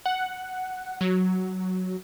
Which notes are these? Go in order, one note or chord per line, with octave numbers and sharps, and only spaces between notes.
F#5
F#3